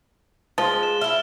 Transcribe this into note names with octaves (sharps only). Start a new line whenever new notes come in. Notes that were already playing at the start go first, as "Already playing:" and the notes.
F3 G#3 A6 G7
E7
E4 E5 F6